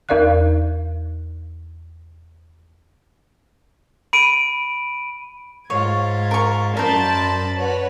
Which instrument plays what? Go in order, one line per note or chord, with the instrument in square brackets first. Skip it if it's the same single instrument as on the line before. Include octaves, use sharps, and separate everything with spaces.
[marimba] E2 D#4 A#4 D5 F5 F#6
[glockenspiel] B5 D7 D#7
[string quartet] G#2 F4 G#6 [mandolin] C#5
[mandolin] A#4 C#6
[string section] F#2 A5 [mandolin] A#4 C5 [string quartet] D5 D#5 B5
[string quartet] F#4 B4 [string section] C#5